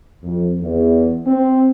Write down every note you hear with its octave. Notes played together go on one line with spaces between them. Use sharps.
F2
E2
C4